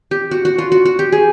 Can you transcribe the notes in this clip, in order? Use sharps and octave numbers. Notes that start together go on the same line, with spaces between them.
G4
F#4
F#4
F4
F#4
F#4
G4
G#4